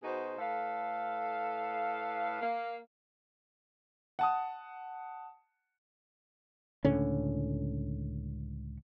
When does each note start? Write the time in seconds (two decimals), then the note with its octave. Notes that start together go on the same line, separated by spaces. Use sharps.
0.03 B2 B3 D#4 F#4 G#4 C5
0.37 A2 A4 B4 F5
2.41 A#3 F5
4.19 F#5 A5 D#6
6.85 C#2 A2 D3 C#4